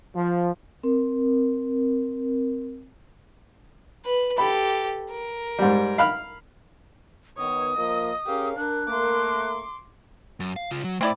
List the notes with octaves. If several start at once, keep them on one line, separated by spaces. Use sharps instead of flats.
F3
C4 A#4
B4
G4 A4 B5
A#4
G#2 G3
F5 B5 F6
D#3 B3 C#5 D#6
F3 A#3 D#5
C#4 G4 G#4 A#4 F5
D4 A#4 F#6
A3 A#3 A#4 C6 D6
F#2
F5
C#3 F4
F#3
A2 C4 E4 D5